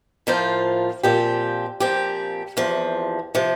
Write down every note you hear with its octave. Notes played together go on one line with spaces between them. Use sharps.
A2 F3 A#3 F4 C5
A#2 F3 C4 G4
A#2 F3 C4 G4
E2 C3 F3
C3 F3